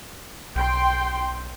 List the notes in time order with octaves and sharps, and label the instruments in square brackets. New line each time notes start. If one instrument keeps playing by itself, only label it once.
[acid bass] B1 [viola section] G5 C6